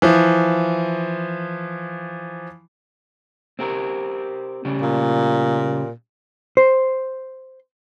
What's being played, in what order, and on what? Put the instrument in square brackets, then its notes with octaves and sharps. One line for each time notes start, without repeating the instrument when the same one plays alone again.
[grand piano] E3 F3
[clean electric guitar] C4 G4 A#4
C#3 G3
[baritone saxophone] A#2
[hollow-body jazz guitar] C5